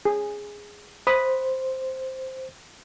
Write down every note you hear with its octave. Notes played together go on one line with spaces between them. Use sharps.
G#4
C5 B5 D#6